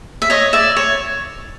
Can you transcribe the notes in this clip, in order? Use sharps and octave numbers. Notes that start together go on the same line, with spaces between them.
E5
C#5 D#5
D5 E5
C#5